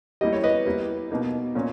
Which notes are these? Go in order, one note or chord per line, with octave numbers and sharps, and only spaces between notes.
G3 A#3 E4 D#5
C#5
B4 D#5
G3 A#3 E4
B2 A#3 D#4
A#2 A#3 C#4